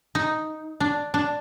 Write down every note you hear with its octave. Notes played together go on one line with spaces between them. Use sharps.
D#4
D4
D4